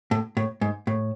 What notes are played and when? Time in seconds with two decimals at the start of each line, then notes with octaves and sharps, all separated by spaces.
0.11 A2
0.37 A2
0.61 G#2
0.87 A2